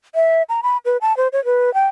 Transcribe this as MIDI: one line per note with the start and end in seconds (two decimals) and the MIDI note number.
0.15 0.43 76
0.49 0.61 82
0.63 0.77 83
0.85 0.97 71
1.01 1.16 81
1.17 1.28 72
1.33 1.43 73
1.45 1.73 71
1.74 1.87 79